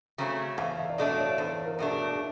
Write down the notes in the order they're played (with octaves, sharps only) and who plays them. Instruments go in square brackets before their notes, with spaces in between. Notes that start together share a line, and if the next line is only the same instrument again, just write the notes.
[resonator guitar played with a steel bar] C#3 F#3 A3 C4
[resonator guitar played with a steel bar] E2 [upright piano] F5
[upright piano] E5
D5
[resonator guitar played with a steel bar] B2 F#3 A3 D4 [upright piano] D#5
[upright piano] C#5
[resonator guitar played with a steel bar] E2 [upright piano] C5
[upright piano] A#4
[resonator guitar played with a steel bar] B2 F#3 A3 D4
[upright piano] G#4